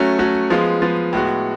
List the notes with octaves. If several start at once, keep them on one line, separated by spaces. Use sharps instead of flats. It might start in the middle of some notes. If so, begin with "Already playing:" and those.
Already playing: F#3 A3 C#4 F#4
F#3 A3 C#4 F#4
F3 G#3 B3 F4
F3 G#3 B3 F4
A2 G#3 B3 F#4